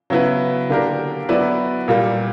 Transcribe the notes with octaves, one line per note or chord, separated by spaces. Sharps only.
C#3 F#3 B3 E4 B4
D3 A#3 D4 G4 A#4
F#3 B3 E4 B4 D5
A#2 G3 A#3